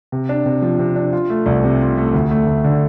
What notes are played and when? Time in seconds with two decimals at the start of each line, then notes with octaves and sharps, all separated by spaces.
0.12 C3
0.29 D4
0.46 C3
0.62 F3
0.79 C3
0.96 D4
1.13 F4
1.30 A3
1.46 C2
1.64 C3
1.81 F4
1.98 A3
2.14 D2
2.31 A3
2.47 D2
2.64 D3